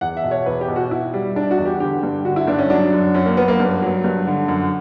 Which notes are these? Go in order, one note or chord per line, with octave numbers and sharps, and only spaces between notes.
E2 F#5
E5
B2
C#5
E2 B4
G4
B2
F#4
B2 E4
G3
G3 D4
F#4
E2
G4
D3 G4
G2
D3 F#4
E4
G2 D4
C#4
F#3 D4
F#2
F#2 C#4
A#3
F#2 B3
A#3
G2
F#3
G2
D3
F#2